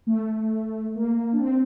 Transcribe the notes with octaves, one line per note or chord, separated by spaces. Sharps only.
A3
A#3
D4
C4